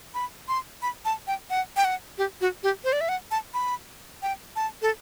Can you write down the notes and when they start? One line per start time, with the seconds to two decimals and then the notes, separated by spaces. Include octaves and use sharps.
0.14 B5
0.48 C6
0.82 B5
1.05 A5
1.27 G5
1.50 F#5
1.77 G5
1.85 F#5
2.18 G4
2.41 F#4
2.63 G4
2.84 C5
2.93 D5
3.01 E5
3.09 F#5
3.31 A5
3.54 B5
4.22 G5
4.56 A5
4.82 A4